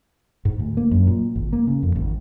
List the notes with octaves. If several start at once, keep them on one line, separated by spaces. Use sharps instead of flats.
G#2
D2
A#3
F#2
A#2
G#1
A#3
C#3
F2
G#1